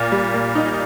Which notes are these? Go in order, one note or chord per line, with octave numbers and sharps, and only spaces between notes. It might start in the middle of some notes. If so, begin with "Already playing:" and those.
Already playing: A#2
G3
A#3
D#4